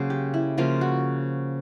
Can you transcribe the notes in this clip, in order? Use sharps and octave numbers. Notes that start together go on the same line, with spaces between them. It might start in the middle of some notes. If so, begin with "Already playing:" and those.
Already playing: C#3 F#3 A#3 C5
G4
E4
C#3 F3 A#3 F4
F#4